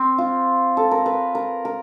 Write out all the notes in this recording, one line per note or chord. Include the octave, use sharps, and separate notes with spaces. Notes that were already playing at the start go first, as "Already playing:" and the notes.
Already playing: C4
F4
A4
A#4
B4
A#4
A#4